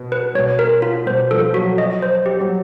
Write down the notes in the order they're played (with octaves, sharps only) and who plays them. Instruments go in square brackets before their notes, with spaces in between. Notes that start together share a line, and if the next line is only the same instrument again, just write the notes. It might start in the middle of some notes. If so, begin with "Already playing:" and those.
Already playing: [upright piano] B2
[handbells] B4
[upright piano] B2 [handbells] C#5
[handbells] A#4
F4
[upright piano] B2 [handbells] C5
[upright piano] F3 [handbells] A4
[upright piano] F#3 [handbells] F#4
[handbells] D#5
C5
G4
[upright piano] F#3